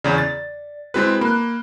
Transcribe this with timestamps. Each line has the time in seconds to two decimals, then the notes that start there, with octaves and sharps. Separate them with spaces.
0.04 E2 C#3 D5
0.18 A6
0.94 G#3 C4 E4 F#4 G#4 B4
1.21 A#3 B5 F#6